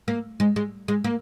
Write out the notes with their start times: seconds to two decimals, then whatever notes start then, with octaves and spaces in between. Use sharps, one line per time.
0.08 A#3
0.40 G#3
0.56 G#3
0.88 G#3
1.04 A#3